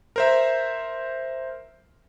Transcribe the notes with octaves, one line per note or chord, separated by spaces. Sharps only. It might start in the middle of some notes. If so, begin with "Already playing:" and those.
A#4 C5 E5